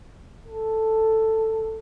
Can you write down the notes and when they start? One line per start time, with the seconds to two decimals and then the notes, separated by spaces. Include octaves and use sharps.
0.46 A4